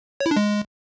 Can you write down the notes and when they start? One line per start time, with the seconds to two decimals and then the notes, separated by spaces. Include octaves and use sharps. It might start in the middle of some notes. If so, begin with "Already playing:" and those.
0.20 C#5
0.26 E4
0.31 D4
0.36 G#3